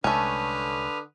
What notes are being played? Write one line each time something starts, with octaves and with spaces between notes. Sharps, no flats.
C2 D3 G#3 A3 C#4 B4 D#6 F6